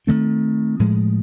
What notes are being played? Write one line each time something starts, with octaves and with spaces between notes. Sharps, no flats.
D#3 F#3 A3 C4
A2 F3 G#3